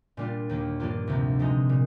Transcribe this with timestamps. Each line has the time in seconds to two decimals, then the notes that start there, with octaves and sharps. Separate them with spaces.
0.17 A#2 G3 D4 F4
0.49 D#2 D#3 A#3
0.80 G2 F3 A#3 D4 F4
1.07 D2 C3 D#3
1.39 C3 F3 G#3 D#4
1.69 A#2